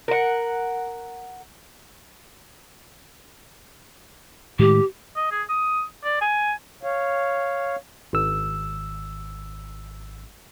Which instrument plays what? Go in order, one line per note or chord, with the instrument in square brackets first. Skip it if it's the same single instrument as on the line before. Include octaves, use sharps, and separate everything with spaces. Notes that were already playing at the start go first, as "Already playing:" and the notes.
[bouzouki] A#4 F#5
[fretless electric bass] A2 D#3 G#3 [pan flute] G4
[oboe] D#5
G#4
D#6
D5
G#5
[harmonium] C#5 F5
[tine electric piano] G#1 E6